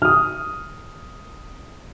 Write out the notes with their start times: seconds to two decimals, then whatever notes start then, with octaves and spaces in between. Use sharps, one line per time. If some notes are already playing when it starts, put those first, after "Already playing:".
0.02 D#6 F6